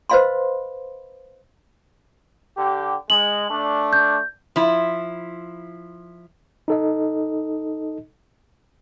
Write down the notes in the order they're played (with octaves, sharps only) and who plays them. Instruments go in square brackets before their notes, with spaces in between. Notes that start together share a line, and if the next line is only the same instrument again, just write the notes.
[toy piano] B4 C5 D#5 F5 B5 C6
[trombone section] D3 G4
[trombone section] G#3 [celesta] F#7
[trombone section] A3 D4
[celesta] G6
[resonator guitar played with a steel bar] F3 E4
[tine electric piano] D#4 A4 D#5